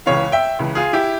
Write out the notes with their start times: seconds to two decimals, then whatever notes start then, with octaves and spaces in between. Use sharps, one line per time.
0.06 C#2 C#3 E3 C#5 F5
0.32 E5 G5
0.59 C#2 C#3 E3
0.75 F4 G#4
0.93 E4 G4